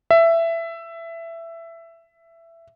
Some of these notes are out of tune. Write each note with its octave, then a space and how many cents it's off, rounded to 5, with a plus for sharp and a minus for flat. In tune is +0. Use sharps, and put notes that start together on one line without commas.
E5 +15